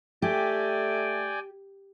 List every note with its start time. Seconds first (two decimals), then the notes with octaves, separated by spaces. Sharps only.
0.22 A3 G4 D5 G5 G#5